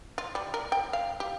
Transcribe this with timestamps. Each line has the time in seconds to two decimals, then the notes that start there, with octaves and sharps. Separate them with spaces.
0.18 F4
0.35 G3
0.54 A#4
0.72 G5
0.93 F5
1.20 G4